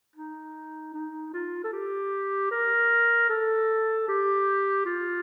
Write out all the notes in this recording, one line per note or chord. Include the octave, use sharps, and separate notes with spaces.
D#4
D#4
F4
A4
G4
A#4
A4
G4
F4